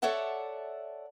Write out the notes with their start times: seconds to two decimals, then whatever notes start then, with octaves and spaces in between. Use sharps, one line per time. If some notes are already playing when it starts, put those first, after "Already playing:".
0.02 A4 C#5 D5 E5 F#5 A5